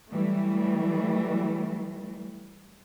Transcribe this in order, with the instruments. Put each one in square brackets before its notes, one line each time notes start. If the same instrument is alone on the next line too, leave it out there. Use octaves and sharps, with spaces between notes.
[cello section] E3 F#3 G3 A3